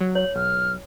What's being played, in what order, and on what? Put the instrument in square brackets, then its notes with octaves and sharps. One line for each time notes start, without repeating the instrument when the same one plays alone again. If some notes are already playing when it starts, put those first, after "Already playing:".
[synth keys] F#3
[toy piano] C#5 [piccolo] F#7
[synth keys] B1 [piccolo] F6